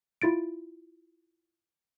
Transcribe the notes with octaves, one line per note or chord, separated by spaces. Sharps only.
E4 F4 A6 D7